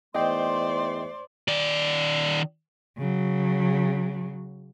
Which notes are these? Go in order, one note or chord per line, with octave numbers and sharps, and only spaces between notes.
E2 G#2 A3 C5 D5 D#5 G5 C6
D#3 D5
C#3 F#3